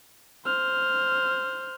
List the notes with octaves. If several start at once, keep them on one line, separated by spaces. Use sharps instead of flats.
C5 F6